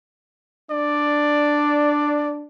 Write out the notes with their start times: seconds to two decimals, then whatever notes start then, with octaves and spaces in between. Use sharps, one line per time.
0.71 D4 D5